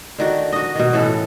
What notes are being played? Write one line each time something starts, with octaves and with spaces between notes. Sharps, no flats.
D3 D#3 F#4
F#4 D#5
B2 D#3
A2 E3 C#4 A4